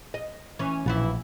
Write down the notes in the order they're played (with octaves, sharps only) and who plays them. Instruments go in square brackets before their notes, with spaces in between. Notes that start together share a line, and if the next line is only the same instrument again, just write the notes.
[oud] D#5
E3 C#4
[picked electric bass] A#1 [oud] B2 E3 E4